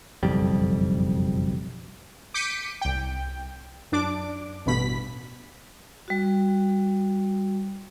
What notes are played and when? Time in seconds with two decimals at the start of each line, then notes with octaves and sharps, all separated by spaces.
0.23 F#1 B1 F2 G3
2.34 D6 G6 B6 C#7 D#7
2.81 C2 G5
3.92 F#2 D4 D6
4.66 A1 G2 B2 B5 B6
6.08 G3 F#4